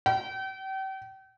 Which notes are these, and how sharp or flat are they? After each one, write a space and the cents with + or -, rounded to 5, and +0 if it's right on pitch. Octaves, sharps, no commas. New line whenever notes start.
G5 -35